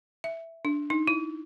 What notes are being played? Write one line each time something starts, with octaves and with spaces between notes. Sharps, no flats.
E5
D4
D#4
E4